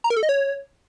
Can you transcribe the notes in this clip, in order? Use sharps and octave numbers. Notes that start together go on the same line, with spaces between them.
A#5
A#4
A4
D#5
C#5